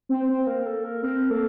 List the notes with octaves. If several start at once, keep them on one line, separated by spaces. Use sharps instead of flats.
C4
C5
C4
A#3 A#4
A4
A#4
C4 A#4
A#3 A4